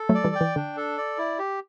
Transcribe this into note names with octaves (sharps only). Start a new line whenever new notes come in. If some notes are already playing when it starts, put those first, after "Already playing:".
Already playing: A4
F#3 A3
D5
E3 G3
G5
E3
D3 D4
A4
D5
E4
G4